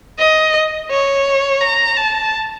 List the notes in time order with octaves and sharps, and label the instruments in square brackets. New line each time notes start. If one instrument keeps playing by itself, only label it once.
[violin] D#5
C#5
A#5
A5